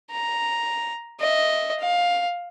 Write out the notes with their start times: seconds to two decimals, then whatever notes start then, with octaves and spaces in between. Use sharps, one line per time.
0.11 A#5
1.20 D#5 E5
1.79 F5